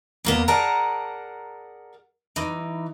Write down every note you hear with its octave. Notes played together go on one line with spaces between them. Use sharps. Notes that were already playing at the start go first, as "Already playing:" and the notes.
E2 A#3 B3
G#4 A#4 D5 F#5 A5 A#5
E3 D#4